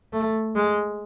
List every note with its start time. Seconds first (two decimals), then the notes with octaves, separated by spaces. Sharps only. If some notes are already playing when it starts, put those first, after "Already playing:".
0.13 A3
0.55 G#3